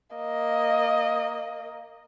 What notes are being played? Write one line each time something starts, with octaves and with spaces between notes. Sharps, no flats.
A#3 D#5